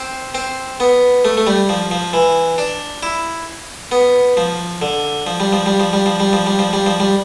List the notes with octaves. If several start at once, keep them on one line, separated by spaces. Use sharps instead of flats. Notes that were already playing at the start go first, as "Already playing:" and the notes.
Already playing: C4
C4
B3
A3
A3
G3
F3
F3
E3
D4
E4
B3
F3
D3
F3
G3
F3
G3
F3
G3
F3
G3
F3
G3
F3
G3
F3
G3